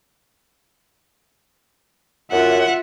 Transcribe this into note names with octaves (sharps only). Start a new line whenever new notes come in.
F#2 F4 E5 F#5